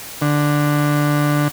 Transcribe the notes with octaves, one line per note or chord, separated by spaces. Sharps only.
D3